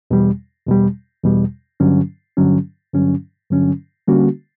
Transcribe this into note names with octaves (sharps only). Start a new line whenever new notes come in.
E2 B2 G3
E2 B2 G3
E2 B2 G3
G2 D3 F#3 C#4
G2 D3 F#3 C#4
G2 D3 F#3 C#4
G2 D3 F#3 C#4
D3 G3 A#3 C#4 F#4